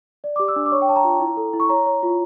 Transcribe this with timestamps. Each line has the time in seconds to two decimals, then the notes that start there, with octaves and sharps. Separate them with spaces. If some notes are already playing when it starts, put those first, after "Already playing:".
0.24 D5
0.36 D6
0.39 G4
0.48 E6
0.56 D4
0.66 D6
0.72 C#5 C#6
0.82 G5
0.89 C#5 A5
0.96 A#5
1.04 F4
1.20 E4
1.37 A4
1.53 E4
1.60 C#6
1.69 C#5 A#5
1.86 C#5
2.03 F4